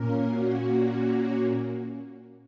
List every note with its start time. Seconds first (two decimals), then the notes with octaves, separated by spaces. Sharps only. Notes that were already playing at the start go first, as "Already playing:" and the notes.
Already playing: A#2 A#3 C#4 A#4
0.29 F#4